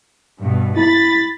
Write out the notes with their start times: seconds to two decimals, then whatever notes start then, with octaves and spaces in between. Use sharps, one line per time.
0.40 G2 B2
0.76 E4 B5 A6